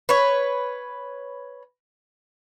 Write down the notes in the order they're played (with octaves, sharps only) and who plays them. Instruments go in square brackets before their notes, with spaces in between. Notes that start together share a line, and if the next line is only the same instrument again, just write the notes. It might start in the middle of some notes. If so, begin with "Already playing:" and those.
[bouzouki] B4 C#5